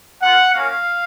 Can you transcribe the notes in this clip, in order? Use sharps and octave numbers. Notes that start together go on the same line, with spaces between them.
A#3 F4 F#5
A#3 C#4 F#4 F5